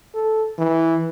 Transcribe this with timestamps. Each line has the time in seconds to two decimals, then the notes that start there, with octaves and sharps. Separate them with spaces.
0.15 A4
0.58 E3